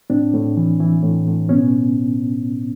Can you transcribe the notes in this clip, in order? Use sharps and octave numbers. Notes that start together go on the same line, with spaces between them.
A2 C4 D4
A2
E3
E3
A2
A2
B2 B3 C#4